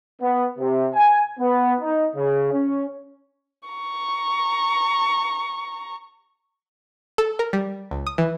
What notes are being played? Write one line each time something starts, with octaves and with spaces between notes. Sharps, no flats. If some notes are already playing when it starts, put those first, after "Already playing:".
B3
C3
G#5
B3
D#4
C#3
C#4
A#5 C#6
A4
A#4
G3
C#2
D#6
E3